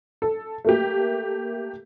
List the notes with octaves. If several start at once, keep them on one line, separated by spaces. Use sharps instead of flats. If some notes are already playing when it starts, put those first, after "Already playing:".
A4
A3 A#3 G4